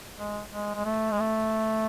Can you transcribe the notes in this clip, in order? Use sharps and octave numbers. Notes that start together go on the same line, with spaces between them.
G#3
G#3
G#3
A3
G#3
A3